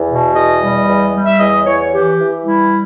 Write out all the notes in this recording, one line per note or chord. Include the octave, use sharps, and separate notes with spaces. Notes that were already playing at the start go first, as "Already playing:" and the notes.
Already playing: E2
B2
E2 D#5
G3
E2
G3
E5
E2 D#5
E2 C#5
E3 G4
E3
G3 E4